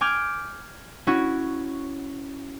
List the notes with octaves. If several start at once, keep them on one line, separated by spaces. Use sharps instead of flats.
G#5 D6 F6 G6
C#4 E4 F#4